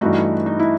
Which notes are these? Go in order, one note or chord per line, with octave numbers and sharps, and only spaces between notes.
G2 E3 A3 D#4 F#4
D#4
E4